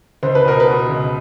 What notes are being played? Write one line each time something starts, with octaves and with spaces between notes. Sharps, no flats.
C#2 C5
B4
B2 A#4
B4
B2
C#2